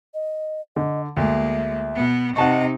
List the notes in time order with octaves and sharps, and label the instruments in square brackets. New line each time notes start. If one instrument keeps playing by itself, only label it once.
[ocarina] D#5
[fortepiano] D3 [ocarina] D#5
[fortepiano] D2 [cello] G#3 A#3 [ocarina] E5
[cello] B2 B3
[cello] C3 D#4 [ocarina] D#5 [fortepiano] F#5 A5 C#6